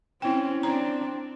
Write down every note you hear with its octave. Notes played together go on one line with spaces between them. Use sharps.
C4 C#4 E4 G5
C4 D4 A#5